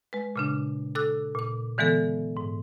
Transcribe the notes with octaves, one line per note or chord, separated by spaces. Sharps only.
G#3 B4
A#2 C#3 D4
A4 D6 E6 F#6
A#2 D6
D3 E3 G#3 B3 A4
G#2